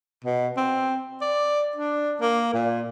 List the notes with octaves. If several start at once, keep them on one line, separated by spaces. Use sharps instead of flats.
B2
C4
D5
D4
A#3
A#2